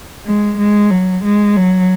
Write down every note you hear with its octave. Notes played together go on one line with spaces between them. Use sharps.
G#3
G#3
F#3
G#3
F#3